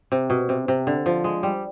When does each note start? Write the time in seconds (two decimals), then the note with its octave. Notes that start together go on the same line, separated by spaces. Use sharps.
0.12 C3
0.30 B2
0.49 C3
0.68 C3
0.87 D3
1.06 F3
1.24 G#3
1.43 G3